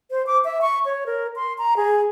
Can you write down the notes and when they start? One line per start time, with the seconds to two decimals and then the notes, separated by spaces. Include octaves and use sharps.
0.11 C5
0.27 D6
0.45 E5
0.61 C#6
0.86 C#5
1.06 A#4
1.36 C6
1.58 A#5
1.77 G#4